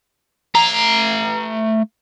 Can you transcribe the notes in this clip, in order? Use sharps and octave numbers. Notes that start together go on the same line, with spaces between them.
A3 A#5